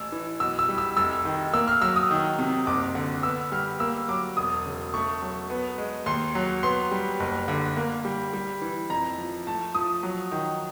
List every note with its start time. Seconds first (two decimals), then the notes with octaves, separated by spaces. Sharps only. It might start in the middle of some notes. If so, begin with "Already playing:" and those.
Already playing: A1 E6
0.12 E3
0.40 B1 E6
0.59 E6
0.69 G3
0.78 E6
0.97 F1 E6
1.25 D#3
1.54 A#3 E6
1.67 F6
1.82 F#3 E6
1.96 D#6
2.11 D#3
2.39 C3
2.67 F#1 D6
2.95 D3
3.23 B3 E6
3.52 G3 F6
3.80 A#3 E6
4.08 F#3 D6
4.37 E1 D#6
4.66 C#3
4.94 A3 C#6
5.22 F#3
5.50 B3
5.78 G#3
6.06 D#2 C6
6.35 F#3
6.63 B3 C6
6.91 G3
7.20 F#1
7.48 D3
7.77 A#3
8.05 G3
8.33 G3
8.62 E3
8.90 F2 A#5
9.18 F3
9.47 A3 A5
9.75 F3 D#6
10.03 F#3
10.32 D#3